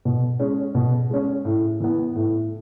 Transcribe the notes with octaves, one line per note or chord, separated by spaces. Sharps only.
B2
G#3 C#4
B2
G#3 C#4
A2
E3 B3
A2